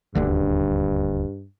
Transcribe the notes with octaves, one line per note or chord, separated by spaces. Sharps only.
D#1 D2 G2 D3